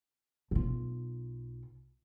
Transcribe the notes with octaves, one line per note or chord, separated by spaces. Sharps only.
B1 F4